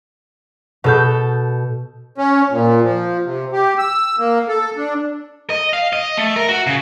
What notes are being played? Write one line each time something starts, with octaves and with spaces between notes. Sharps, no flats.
B2 A4 G6
C#4
A#2
F3
C3
G4
E6
A#3
A4
D4
D#5
F5
D#5
A3
A#4
F#4
C#3